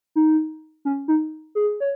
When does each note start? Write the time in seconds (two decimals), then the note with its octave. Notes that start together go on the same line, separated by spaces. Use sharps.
0.15 D#4
0.85 C#4
1.08 D#4
1.55 G#4
1.80 C#5